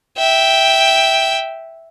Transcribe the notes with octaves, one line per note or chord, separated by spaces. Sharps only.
E5 G5